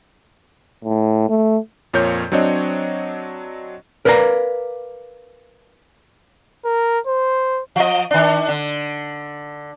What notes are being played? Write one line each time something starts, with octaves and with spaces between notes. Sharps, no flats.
A2
A3
F2 A#2 A#4 C#5 G6
F#3 C4 D4 C#5 D#5
A#4 B4 D5 F5 F#5 A#5
A#4
C5
F3 D#5
D#3 D4
D3